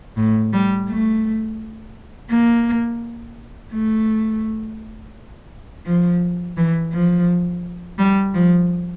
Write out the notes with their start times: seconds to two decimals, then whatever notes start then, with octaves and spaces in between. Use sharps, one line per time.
0.17 A2
0.52 G3
0.88 A3
2.30 A#3
3.72 A3
5.85 F3
6.57 E3
6.92 F3
7.98 G3
8.34 F3